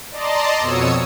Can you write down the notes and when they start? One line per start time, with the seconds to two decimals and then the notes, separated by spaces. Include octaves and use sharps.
0.11 D5 D#5 A5 A#5 C6
0.59 F2 B2 C#5 D#6 E6 C#7